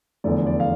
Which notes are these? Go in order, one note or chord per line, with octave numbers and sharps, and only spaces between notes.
F1 E2 D3 D5
D5
F5